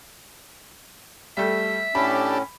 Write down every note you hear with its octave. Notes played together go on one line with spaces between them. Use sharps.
G3 A3 E5
A2 C#4 D4 G4 A4 B5